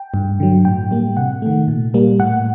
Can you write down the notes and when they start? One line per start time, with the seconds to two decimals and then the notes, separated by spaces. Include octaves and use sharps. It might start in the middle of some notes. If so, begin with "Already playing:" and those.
Already playing: G5
0.14 G2
0.40 D3 F#3
0.65 A2 G5
0.91 G3 A#3
1.17 C3 F#5
1.42 D#3 A3
1.68 A#2
1.94 G3 A#3
2.20 A2 F#5